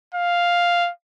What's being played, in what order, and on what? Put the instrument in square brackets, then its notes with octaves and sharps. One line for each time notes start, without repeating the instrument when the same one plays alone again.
[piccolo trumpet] F5